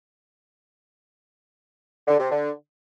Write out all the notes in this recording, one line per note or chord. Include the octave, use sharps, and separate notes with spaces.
D3
C3
D3